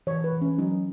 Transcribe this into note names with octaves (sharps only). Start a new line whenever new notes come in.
E3 C#5
B4
E3
C#4
F#3 D#4